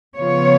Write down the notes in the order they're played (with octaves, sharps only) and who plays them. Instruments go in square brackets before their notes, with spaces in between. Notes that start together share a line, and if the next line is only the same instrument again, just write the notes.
[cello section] C#3 F3 B3 F4 C#5